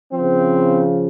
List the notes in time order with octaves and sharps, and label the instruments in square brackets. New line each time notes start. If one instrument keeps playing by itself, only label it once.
[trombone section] C#3 F3 C4